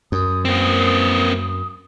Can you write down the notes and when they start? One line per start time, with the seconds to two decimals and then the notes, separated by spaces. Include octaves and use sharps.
0.12 F#2 D#6
0.45 A#3 C4